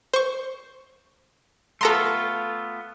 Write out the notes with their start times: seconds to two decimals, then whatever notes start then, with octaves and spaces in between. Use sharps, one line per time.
0.14 C5 C#6
1.81 A3 B3 F4 A4 A#5 C6